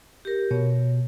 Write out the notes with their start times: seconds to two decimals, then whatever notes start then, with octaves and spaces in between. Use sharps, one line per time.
0.25 G4 A#4
0.51 B2 C#5